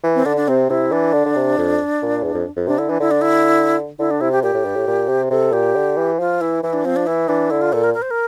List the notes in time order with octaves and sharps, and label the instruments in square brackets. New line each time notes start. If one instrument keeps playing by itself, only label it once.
[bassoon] E3
[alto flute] C4
[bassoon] D3 [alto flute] D4
[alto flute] D4
[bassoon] C3 [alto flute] C4
[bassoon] C3 [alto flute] E4
[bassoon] E3 [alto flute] D4
[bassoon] D3
D3
C3
F2
A#2
E2
F2
F2
[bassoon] C3 [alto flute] D4
[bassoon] D3 [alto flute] E4
[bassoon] E3 [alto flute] D4
[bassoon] D3 [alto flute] E4
[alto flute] D4
E4
[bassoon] D3 [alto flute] E4
[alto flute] D4
[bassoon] C3 [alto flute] E4
[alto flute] G4
[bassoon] A#2 [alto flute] G4
[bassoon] A2
G2
A2
A#2
C3
[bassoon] C3 [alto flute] A4
[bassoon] A#2 [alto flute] G4
[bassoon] D3
E3
[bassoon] F3 [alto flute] F4
[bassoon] E3 [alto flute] E4
[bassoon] E3 [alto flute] E4
[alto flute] D4
[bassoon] F3 [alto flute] C4
[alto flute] D4
[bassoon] E3 [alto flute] E4
[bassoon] E3 [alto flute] D4
[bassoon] D3 [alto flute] E4
[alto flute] F4
[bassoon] A#2 [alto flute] A4
[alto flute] A#4
A#4
C5
A#4